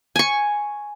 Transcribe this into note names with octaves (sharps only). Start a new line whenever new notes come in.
G#5 C#6